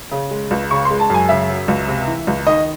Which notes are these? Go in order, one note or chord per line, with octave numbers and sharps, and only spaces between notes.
C#3
G#3
C#2
C#3 C#6
C6
G#3
A5
F#2 G#5
C#3 E5
F#3
C#2
C3
E3
C#2
D#3 D#5